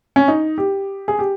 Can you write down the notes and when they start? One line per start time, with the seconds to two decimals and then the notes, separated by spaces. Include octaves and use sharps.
0.16 C#4
0.28 D#4
0.58 G4
1.08 G#4
1.19 G4